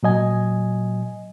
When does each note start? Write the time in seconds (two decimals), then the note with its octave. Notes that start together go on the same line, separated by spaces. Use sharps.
0.03 A#2 F#3 D#5 G#5